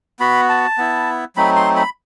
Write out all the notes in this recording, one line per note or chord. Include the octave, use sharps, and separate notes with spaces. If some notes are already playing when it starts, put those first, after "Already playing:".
B3 F#4 B5
A5
B3 E4
F#3 A3 C4 D#4 B5
C6
B5